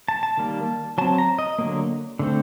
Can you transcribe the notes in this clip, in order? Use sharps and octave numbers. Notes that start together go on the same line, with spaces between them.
A5
A5
D#3 G3 A#3
F#3 C4 A5
A#5
D#5
D3 F#3 A#3
D3 A3 C4